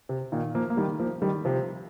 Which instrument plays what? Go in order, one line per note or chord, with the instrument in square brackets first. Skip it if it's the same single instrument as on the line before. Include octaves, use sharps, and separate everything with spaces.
[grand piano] C3
A#2 D#3
F3 A#3
A#3
D#3 G3
F3 A#3
D#3 G3
C3 F3